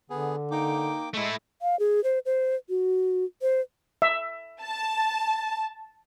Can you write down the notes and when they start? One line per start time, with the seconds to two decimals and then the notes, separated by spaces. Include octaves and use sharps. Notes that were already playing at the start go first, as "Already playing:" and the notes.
0.10 D3 B3 G#4
0.51 A#3 D#4 G5 D6
1.14 G#3 A3 E4
1.62 F5
1.79 G#4
2.04 C5
2.26 C5
2.69 F#4
3.42 C5
4.02 E5
4.62 A5